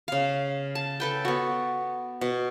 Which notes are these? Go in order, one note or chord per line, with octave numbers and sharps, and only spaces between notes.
C#3 F5
A5
A4 B4 G5
B3 F#4
B2